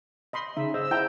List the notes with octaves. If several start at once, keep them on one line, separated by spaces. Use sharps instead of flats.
D#5 B5 C6
C#3 D#4 E5
G#4 C5 D#5 E6
E4 G5 A5 A#5